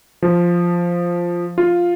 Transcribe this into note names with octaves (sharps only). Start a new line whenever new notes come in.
F3
F4